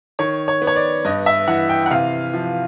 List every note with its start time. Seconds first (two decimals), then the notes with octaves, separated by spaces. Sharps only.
0.19 D#3 C#5
0.48 C#5
0.62 B3
0.67 C#5
0.76 D5
1.05 G2 D#5
1.26 E5
1.48 E3 F#5
1.69 G5
1.86 F#5
1.91 C3 F5
2.34 F3